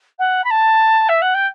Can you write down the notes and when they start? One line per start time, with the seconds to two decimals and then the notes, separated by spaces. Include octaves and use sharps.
0.18 F#5
0.44 B5
0.50 A5
1.08 E5
1.21 F#5
1.34 G5